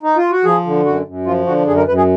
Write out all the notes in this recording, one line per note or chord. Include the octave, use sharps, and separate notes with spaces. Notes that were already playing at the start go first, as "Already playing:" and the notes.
D#4
F4
F#4
F3 G#4
D3
F#2 F#4
F#2
F3 F4
D3 F#4
F#2 G#4
A#4
F#2 B4
G#4